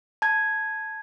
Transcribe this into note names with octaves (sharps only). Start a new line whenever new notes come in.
A5 G#6